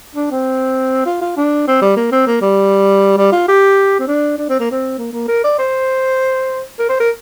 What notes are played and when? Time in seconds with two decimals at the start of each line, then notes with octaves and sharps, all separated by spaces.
0.16 D4
0.31 C4
1.06 F4
1.21 F4
1.37 D4
1.67 C4
1.82 G3
1.96 A#3
2.12 C4
2.27 A#3
2.42 G3
3.17 G3
3.32 F4
3.48 G4
4.00 C4
4.08 D4
4.38 D4
4.49 C4
4.60 A#3
4.72 C4
4.98 A#3
5.13 A#3
5.28 A#4
5.44 D5
5.58 C5
6.79 A#4
6.89 C5
7.00 A#4